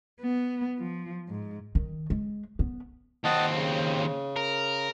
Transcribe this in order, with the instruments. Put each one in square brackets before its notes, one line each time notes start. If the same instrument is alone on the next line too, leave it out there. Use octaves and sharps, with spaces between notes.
[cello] B3
F3
G#2
[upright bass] D#3
G#3
B3
[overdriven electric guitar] D#2 C4 [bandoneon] D#5 F#5 A5
[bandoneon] C#3
[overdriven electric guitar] A#4